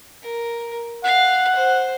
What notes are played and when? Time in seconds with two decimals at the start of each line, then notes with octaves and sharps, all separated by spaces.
0.22 A#4
1.04 F5 F#5
1.55 C5